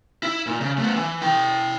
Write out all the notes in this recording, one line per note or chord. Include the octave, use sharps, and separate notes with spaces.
E4
A#2
C#3
A3 B3
E3
E4 G5